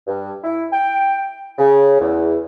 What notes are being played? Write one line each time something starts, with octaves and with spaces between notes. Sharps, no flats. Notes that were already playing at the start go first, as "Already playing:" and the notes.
G2
E4
G5
C#3
E2